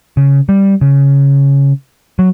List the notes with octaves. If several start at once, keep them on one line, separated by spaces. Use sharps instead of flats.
C#3
G3
C#3
F#3